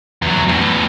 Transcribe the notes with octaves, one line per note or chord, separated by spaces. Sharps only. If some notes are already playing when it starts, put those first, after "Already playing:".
E2 F#3
E2 A2